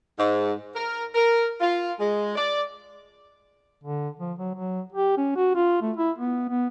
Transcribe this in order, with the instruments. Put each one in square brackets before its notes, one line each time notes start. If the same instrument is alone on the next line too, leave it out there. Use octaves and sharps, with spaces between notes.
[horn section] G#2
A#4
A#4
F4
G#3
D5
[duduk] D3
F3
F#3
F#3
G4
C#4
F#4
F4
A3
E4
B3
B3